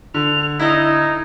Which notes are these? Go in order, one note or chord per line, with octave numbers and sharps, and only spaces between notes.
D3 F7
D#4 E4 D#5 G#6